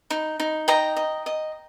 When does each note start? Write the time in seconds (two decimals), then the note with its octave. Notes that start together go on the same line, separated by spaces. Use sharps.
0.11 D#4
0.40 D#4
0.68 D#5 G5 A#5
0.97 D#5
1.26 D#5